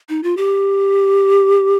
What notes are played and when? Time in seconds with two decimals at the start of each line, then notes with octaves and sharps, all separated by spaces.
0.09 D#4
0.23 F4
0.37 G4